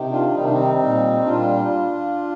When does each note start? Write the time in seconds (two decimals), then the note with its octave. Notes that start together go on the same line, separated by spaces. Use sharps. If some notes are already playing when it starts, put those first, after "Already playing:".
Already playing: C3 D#3
0.12 D4 F4
0.34 C3 D#3 G3 D#4
0.44 D4
0.53 C4 D#4
0.79 A#2 G3
1.25 A#2 G3 D4 F4